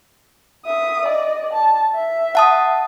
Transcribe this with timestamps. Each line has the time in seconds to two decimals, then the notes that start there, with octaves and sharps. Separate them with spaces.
0.66 E5 D#6
1.04 D5 D#5
1.53 A5
1.95 E5
2.35 F#5 A5 D#6